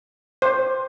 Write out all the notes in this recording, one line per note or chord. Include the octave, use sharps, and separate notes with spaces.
C5